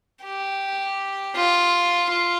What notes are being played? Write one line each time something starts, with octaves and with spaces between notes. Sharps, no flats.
G4
F4
F4